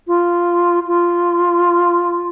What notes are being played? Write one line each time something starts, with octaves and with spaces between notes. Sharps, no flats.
F4
F4